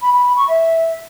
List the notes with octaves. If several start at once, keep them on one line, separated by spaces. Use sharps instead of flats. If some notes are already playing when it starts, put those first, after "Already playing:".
B5
B5
B5
C#6
E5